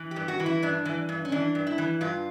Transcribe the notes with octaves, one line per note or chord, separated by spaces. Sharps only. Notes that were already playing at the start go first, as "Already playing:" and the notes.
Already playing: E3
G4
G2
F#4
E3
E4
G2 D4
E3
G2
C#4
E3 D4
G2
E4
E3
G2 F4